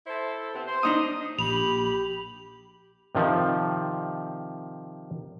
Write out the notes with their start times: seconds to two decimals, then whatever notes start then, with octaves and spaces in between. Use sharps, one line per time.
0.07 E4 A4 C5
0.53 C3 B3 C4
0.66 C5
0.83 D4 D#4 D#6
1.39 A#1 G4 B5 F7
3.15 C3 D#3 F3